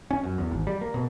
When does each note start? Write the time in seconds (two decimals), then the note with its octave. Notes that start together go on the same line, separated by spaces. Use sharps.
0.11 C#4
0.23 F#2
0.38 E2
0.51 G#1
0.67 G3
0.81 A#3
0.94 B2